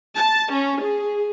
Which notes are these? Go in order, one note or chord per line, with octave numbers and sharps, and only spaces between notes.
A5
C#4
G#4